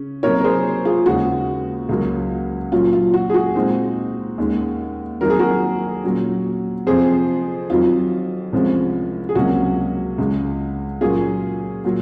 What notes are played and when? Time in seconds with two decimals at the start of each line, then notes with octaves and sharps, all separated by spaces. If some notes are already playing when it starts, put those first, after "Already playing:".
Already playing: C#3 C#4
0.23 C3 F#3 A#3 D#4 A#4 C#5
0.40 A#4
0.44 G#4 C5
0.85 F4 G#4
1.06 D#2 C#3 G#3 D#4 F#4
1.89 C#2 C#3 F#3 A#3 C#4
2.72 A#2 F#3 C#4 F4
2.93 F4
3.14 F#4
3.30 G#4
3.34 F#4
3.55 A#2 G#3 C4 D#4
4.38 D#2 D#3 G#3 C#4
5.21 F2 D#3 F#3 A#3 A#4
5.30 G#4
5.39 F#4 A#4
6.04 A#2 F#3 C#4
6.87 F2 C3 F3 G#4 C5
7.70 F2 D#3 F#3 F4
8.53 C2 C3 F3 G#3 C#4
9.29 G#4
9.35 C#2 C3 F#3 A#3 C#4 F#4
10.18 C#2 C#3 G#3
11.01 A#2 F#3 A#3 C#4 F4 G#4
11.84 A#2 F#3